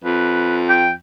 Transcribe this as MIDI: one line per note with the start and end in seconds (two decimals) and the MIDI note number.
0.04 0.95 41
0.04 0.59 71
0.69 0.90 79